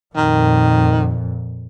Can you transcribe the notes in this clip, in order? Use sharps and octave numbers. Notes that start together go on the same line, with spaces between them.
F2 A#2 D#3